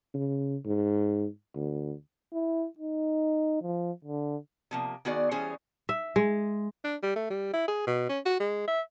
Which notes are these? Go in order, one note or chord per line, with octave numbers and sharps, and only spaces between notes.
C#3
G#2
D2
E4
D#4
F3
D3
C3 F3 A#3
D#3 B3 F#4 G#4 D5
E3 G3 C#4 G#4 C5
E5
G#3
D4
G3
A3
G3
E4
G#4
B2
C#4
F#4
G#3
E5